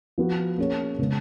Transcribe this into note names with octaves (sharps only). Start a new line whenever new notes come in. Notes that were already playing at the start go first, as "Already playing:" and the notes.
F3 B3 F#4
A#3 C#4 G#4 C#5
C#3 G#3 B3